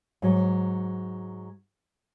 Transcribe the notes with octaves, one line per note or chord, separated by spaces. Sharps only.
G#2 F#3